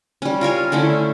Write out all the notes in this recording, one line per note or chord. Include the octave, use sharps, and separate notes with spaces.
G3 C#4
F4 A#4 C#5 G#5
D3 A3 C#4 E4